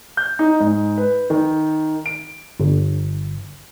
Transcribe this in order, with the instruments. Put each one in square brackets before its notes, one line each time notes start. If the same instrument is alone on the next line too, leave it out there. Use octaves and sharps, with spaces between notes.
[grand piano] G6
D#4
G#2
B4
D#3
D7
[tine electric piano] G1